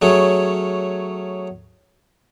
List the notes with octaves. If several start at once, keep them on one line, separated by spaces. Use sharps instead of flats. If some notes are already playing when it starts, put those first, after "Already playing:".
F#3 A3 C#4 G#4